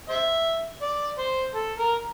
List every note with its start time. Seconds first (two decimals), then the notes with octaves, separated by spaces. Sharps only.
0.09 C5 E5
0.82 D5
1.19 C5
1.55 A4
1.79 A#4